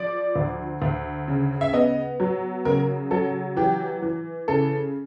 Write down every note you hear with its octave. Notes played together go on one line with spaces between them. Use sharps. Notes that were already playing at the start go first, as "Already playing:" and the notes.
Already playing: F3 D5
D2
D2
C#3
E5
B3 D#5
F#3
C#3 A#4
F#3 A4
E3 G4
E3
C#3 A4